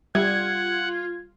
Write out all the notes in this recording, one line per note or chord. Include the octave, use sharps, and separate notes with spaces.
G3 F4 F#5 G#6